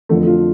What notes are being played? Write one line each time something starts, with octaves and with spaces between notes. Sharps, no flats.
F2 D3 F3 A3
F4